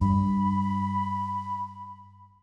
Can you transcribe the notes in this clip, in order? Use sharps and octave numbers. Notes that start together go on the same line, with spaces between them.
G2 B5